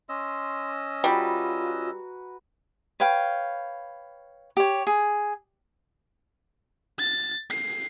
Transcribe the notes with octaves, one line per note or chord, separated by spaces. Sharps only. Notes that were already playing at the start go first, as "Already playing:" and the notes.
C#4 D#5 C6 E6
G3 F4 F#4 B4 A#5
B4 C#5 F5 G5
G4 C#5
G#4
A6
C7